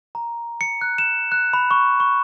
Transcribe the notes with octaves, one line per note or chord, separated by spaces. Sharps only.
A#5
C#7
F#6
E7
F#6
B5
C#6
C#6